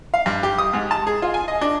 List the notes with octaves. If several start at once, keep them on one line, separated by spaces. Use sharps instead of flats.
F5
G2
G4
D#6
G#2
A5
G#4
F4
G#5
D#5
D4